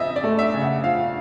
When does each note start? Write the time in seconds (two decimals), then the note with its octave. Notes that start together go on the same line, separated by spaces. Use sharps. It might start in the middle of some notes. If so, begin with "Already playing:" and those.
Already playing: C#3 F3 C4 D#5 E5
0.16 D5
0.24 A3
0.39 E5
0.54 C#3
0.62 F#5
0.84 F3 F5